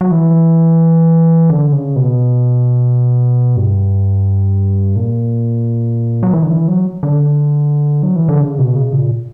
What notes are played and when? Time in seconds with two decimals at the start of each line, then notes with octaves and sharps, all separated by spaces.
0.01 F#3
0.11 E3
1.50 D3
1.72 C#3
1.96 B2
3.57 G2
4.96 A#2
6.23 F#3
6.33 E3
6.43 D3
6.50 E3
6.68 F#3
7.03 D3
8.03 F#3
8.16 E3
8.29 D3
8.41 C#3
8.59 B2
8.76 C#3
8.93 A#2